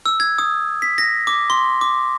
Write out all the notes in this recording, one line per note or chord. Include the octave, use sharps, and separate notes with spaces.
E6
G#6
D#6
B6
A#6
D6
C6
D6